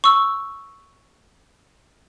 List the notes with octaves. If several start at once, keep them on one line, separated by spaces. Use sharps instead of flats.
C#6 E6